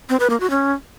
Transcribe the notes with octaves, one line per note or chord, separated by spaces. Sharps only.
C4
B4
A#3
F#4
C#4